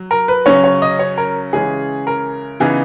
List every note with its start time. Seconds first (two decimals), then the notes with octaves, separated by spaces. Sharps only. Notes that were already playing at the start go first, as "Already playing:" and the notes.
Already playing: F#3
0.11 A#4
0.28 B4
0.46 C#3 F#3 C#4 C#5
0.64 C#5
0.82 D#5
0.99 C#5
1.18 A#4
1.53 C#3 E3 G#3 C#4 G#4
2.07 A#4
2.60 C#3 E3 B3 D#4 G#4